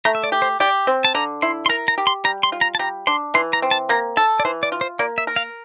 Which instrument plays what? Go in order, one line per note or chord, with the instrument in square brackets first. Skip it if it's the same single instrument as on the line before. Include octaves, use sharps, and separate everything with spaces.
[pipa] A3 [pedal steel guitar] A#5
[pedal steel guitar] E5
D5
[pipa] G4
[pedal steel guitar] C5
[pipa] G4 [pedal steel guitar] D5
[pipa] C4
[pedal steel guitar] A5
[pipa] D3 [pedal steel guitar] A#5
[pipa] E4 [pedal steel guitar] C6
[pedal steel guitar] C6
[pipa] A#4 [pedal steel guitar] A#5
[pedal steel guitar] A#5
[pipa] G4
[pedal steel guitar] C6
[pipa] G3 [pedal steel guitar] A#5
[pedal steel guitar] C6
[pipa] F4
[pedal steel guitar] A#5
A5
[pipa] G3 [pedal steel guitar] A#5
[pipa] D4 [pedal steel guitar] C6
[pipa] E3 [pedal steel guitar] C6
[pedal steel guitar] A#5
[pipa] C4
[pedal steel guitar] A5
[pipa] A#3 [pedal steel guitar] A#5
[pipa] A4 [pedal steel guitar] A5
[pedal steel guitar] D5
[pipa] E3 [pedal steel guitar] C5
[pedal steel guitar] D5
[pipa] F4
[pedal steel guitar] C5
[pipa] A#3 [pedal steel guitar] D5
[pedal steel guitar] E5
[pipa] A#4
[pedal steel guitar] F5